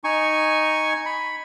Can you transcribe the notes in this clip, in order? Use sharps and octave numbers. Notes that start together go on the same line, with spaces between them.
D#4 G#5 C#6
B5